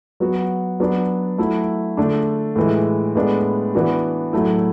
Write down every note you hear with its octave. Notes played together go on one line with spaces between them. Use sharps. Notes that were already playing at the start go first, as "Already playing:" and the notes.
F#3 B3 F#4
F#3 B3 D4 F#4
F#3 A3 E4
D3 A3 D4
A2 E3 G#3
A2 G#3 B3 D4
E3 B3 D4 F#4
A2 F#3 A3 E4